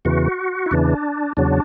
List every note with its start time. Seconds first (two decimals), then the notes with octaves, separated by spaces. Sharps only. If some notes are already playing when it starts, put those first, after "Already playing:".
0.05 E2 C#3 E3 F#4
0.66 E4
0.71 E2 C#3 E3 D4
1.37 E2 C#3 F#3 D4